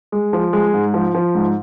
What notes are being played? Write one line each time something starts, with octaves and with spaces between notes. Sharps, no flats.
G#3
F3
G#3
G#2
F3
F3
G#2